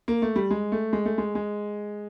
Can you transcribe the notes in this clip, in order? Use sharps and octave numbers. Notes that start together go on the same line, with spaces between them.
A#3
A3
G3
G#3
A3
G#3
A3
G#3
G#3